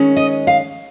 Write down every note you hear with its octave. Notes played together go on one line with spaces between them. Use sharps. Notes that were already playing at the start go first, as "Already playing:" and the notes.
Already playing: D#3 G#3 C#4
D#5
F5